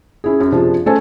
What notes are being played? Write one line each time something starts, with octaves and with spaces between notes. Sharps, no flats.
C#4 E4 G#4
F#2
C3 F3 D4 G#4
A3 C#4 A4 C5 G#5 A5